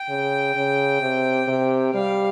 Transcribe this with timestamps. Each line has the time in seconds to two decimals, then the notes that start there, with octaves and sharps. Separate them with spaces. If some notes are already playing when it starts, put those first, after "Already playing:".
Already playing: G5
0.09 C#3
0.55 C#3
1.01 C3
1.48 C3
1.93 G3 F5